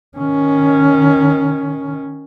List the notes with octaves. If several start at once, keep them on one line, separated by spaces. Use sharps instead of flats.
D#3 C#4